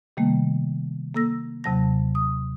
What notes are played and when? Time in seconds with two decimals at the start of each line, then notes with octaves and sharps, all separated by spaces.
0.17 C3 D#3 G3 A3 A#3
1.14 A#3 A4 E6 A#6
1.64 D#2 C3 F#3 A5 A#6
2.15 D#6